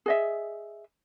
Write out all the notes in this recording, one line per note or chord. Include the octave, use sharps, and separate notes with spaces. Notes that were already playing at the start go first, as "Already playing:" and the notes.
G#4 D#5 E5